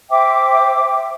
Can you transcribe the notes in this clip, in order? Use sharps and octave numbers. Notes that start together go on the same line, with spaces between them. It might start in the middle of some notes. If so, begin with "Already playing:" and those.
C5 E5 G5 D6